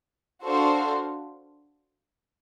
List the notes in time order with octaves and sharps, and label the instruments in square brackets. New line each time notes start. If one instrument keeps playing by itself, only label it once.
[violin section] D4 F#4 A4 C5 F5